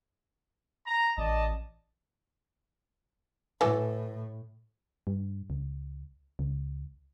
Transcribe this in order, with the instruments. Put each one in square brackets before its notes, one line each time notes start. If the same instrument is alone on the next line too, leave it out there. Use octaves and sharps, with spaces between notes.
[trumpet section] A#5
[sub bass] A1 [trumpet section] D5 D#5 A5
[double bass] A2 [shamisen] E3 F#3 A3
[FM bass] G2
C#2
C#2